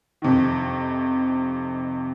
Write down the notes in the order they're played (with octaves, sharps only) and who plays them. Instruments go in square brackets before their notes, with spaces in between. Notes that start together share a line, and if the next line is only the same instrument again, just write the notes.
[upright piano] F2 C3 D#3